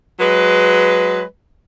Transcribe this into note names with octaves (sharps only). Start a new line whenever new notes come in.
F#3 G#3 B4